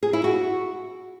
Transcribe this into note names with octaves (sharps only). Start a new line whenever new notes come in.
G#4
E4
F#4